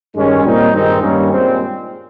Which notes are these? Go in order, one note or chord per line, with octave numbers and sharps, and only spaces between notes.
G2 D#3 G#3 C#4
A#2 G3 C4 D#4
G2 D#3 G#3 C4 D#4
G2 D#3 G3 A#3 C#4
A#2 G#3 C4